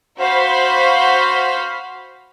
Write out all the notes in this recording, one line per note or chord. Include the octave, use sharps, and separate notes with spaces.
F#4 C5 F5 B5